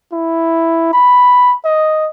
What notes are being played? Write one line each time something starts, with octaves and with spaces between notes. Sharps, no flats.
E4
B5
D#5